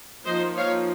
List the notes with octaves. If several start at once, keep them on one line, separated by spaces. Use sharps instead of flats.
F3 A#3 D#4 C5 D#5
C#5 F5